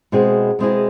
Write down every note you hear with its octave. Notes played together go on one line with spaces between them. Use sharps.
B2 G#3 C4 E4 G#4
B2 G#3 C4 E4 G#4